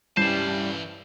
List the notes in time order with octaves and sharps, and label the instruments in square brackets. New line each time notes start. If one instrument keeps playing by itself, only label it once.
[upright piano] C2 G2 C#4 [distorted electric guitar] E3 A5 [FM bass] G3 [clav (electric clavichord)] C5